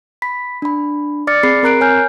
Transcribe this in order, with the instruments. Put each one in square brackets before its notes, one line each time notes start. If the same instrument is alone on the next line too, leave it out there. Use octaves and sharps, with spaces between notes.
[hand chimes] B5 B6
D4 B5
D5 D6 F6 A6 C#7
C4 G#4 B5 C7
C4 A#4 A#5 F#6 C7 D7
C#5 G#5 F6 G6